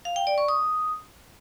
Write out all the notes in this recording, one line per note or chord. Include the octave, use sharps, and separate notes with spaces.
F5
G5
D5
C#6
D#6